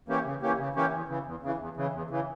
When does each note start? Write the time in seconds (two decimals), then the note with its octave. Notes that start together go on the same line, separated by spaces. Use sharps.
0.08 E3 A#3 C#4 G4
0.25 C#3
0.42 E3 A#3 C#4 G4
0.59 C#3
0.76 E3 A#3 C#4 G4
0.92 E2
1.09 C#3 E3
1.26 E2
1.43 C#3 E3
1.59 E2
1.77 C#3 E3
1.93 E2
2.10 C#3 E3